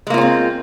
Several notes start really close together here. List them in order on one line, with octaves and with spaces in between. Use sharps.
G#3 A#3 F4 C#4 C4